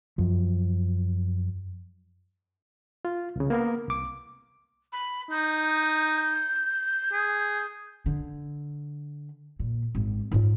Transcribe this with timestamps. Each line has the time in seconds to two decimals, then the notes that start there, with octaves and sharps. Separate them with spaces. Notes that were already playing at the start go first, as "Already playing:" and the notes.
0.18 F#2 F3
3.05 F4
3.36 C2 C#3
3.50 A#3 B3 A#4
3.88 C2 D6
4.93 B5
5.31 D#4 G6
7.13 G#4
8.06 D3
9.59 A#2
9.95 G#1
10.32 G#2 F4